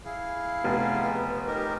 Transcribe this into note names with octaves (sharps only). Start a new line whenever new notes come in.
E4 G#4 F5
F1 B3
D#4 G4 A#4